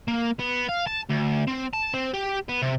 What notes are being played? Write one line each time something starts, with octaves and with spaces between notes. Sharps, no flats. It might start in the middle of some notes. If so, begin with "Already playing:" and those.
A#3
B3
F5
A5
D2
C4
A5
C4
G4
B3
C3